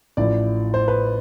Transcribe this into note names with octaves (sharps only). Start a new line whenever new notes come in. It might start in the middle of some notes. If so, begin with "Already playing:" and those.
A1 A2 F3 D5
C5
B4